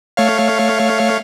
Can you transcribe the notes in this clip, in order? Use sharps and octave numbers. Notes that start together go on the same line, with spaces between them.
A3 C#5 F5